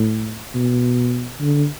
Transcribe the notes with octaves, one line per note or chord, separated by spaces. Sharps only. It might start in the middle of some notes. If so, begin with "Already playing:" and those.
Already playing: A2
B2
D3